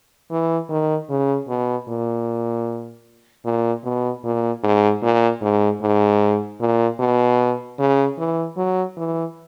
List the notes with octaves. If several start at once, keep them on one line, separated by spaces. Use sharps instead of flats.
E3
D#3
C#3
B2
A#2
A#2
B2
A#2
G#2
A#2
G#2
G#2
A#2
B2
C#3
E3
F#3
E3